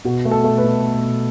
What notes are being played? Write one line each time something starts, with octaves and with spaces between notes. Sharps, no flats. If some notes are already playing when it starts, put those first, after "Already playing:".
B2 F#4
A3
A4
A3
B4
B2